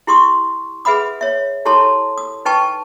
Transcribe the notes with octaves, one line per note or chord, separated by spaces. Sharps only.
E4 G4 C6 C#6 D#6
G#4 B4 E5 F#5 B5 D#6
C#5 E5
E4 G4 A4 C#5 A5 C6
D#6
D#4 B4 G5 A5 C#6